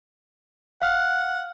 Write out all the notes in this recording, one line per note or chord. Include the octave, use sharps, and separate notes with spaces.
F5 F#5 F6